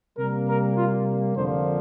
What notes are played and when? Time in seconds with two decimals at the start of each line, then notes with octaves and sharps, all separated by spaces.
0.18 C3 G3 A#3 A#4
0.48 A#4
0.77 F4
1.36 F2 D3 F3 A#3 C5